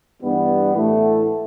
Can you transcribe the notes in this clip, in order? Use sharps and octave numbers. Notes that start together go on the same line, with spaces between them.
G2 E3 G3 B3
A2 E3 A3